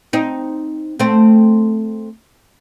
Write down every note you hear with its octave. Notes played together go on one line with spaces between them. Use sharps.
C4 D#4
A3 C4